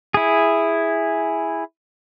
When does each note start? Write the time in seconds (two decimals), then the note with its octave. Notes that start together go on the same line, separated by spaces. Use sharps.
0.14 E4 G#4